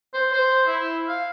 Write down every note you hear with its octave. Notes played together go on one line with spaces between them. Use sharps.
C5
C5
E4
F5